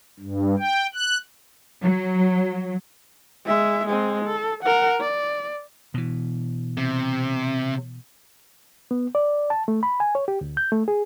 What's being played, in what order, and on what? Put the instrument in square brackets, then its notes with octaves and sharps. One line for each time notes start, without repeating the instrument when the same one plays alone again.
[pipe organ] G2
G5
F#6
[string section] F#3
[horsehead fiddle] G#3 E5
G#3 C4
A4
A#4 F#5
D5
[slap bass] B2 E3
[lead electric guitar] C3
[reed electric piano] B3
D5
A5
A3
B5
G#5
C#5
G4
D2
G6
A3
G#4